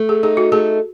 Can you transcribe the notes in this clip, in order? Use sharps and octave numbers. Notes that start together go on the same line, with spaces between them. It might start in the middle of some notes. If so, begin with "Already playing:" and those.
Already playing: A3
G#4
D#4 G#4
F#4
A3 G#4